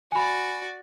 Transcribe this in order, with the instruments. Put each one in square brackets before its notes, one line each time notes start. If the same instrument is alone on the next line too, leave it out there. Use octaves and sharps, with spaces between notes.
[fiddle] F#4 D5 [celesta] G#5 B5